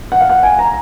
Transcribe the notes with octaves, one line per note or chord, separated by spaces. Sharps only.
F#5
F5
F#5
G#5
A#5